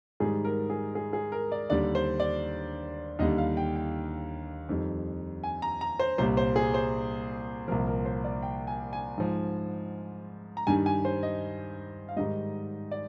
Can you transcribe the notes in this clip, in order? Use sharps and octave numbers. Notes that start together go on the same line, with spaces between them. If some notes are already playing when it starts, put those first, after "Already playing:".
G#2 D#3 G3 G#4
A#4
G#4
G#4
G#4
A#4
D5
D#2 D3 G3 D5
C5
D5
D#2 D3 G3 D#5
F5
G5
G5
F2 D#3 G3
G#5
A#5
A#5
C5
C2 A#2 G3 C5
C5
G#4
C5
C2 A#2 F3 A#4
A#4
C5
D5
G5
G#5
G#5
G#2 F3
A#5
G2 D#3 G3 G#5
G#5
C5
D#5
F5
G#2 D#3 G3 D#5
D5